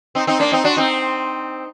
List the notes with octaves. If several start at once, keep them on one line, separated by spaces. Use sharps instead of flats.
C4 D#4
C4 D#4
A#3 D4
C4 D#4
D4 F#4
C4 D#4